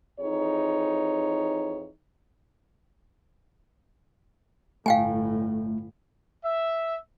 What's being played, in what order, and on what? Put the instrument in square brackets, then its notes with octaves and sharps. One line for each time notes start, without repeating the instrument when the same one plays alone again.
[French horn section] F2 E3 D#4 G#4 C#5
[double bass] G1 A2 [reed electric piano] A3 [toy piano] F5 G5 G#5
[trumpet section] E5